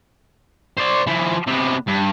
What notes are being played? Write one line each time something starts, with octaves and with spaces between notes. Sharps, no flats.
C5 D5
F3 E4
C3 B3
G2